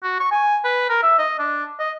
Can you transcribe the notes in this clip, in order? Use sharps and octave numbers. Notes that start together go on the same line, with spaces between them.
F#4
C#6
G#5
B4
A#4
E5
D#5
D4
D#5